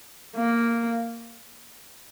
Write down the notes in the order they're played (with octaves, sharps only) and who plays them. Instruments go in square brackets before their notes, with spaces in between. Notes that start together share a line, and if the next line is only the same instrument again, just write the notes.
[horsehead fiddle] A#3